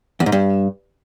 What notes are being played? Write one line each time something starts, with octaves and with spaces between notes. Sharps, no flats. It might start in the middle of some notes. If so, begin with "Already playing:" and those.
E2
G#2
G2